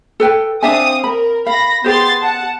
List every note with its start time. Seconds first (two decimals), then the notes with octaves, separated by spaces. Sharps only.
0.20 A4 B4 G5
0.63 C4 D4 E5 F5 G#5 D#6
1.04 A#4 B5
1.46 F5 B5 A#6
1.84 B3 G4 G#4 C5 C6 A6
2.21 F#5 A5